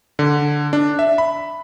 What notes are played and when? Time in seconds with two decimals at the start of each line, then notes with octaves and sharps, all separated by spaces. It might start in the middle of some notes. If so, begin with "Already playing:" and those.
0.19 D3
0.73 D4
0.99 E5
1.18 B5